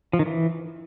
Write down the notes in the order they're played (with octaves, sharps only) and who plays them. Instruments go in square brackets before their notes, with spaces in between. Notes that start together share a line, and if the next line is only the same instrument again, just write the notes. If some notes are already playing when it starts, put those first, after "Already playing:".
[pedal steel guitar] F3
D#3
E3